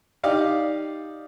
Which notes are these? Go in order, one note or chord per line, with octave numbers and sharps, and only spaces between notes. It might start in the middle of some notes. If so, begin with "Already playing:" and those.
D#4 G4 D5 F5